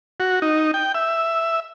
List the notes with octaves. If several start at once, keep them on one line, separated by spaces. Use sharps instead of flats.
F#4
D#4
G5
E5